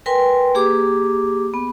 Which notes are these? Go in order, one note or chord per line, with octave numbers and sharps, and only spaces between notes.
A#4 B4 G5 G#5 C6
A#3 G4 G#4 D6
B3